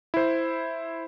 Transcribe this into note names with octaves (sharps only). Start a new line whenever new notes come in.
E4 C5